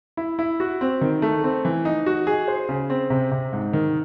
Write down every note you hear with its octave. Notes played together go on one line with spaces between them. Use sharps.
E4
E4
F#4
C4
D#3
A3
C4
E3
D#4
F#4
G#4
C5
C#3
C4
C3
C3
G#2
D#3